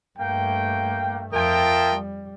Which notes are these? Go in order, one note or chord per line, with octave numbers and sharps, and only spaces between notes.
G2 A3 A#3 G5
F2 F4 A#4 E5 G5 A5 D#6
G3